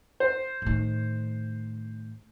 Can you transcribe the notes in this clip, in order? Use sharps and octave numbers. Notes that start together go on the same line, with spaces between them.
C5
A2 D#3